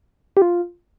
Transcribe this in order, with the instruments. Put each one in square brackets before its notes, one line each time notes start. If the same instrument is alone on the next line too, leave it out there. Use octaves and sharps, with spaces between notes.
[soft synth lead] G4
F4